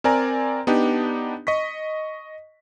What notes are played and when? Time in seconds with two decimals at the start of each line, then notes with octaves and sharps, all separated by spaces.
0.04 C4 A#4 D5 G#5 A#5
0.67 B3 D4 D#4 G4
1.47 D#5 C#6 B6